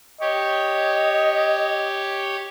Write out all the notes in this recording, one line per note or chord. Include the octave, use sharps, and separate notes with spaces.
G4 C#5 D#5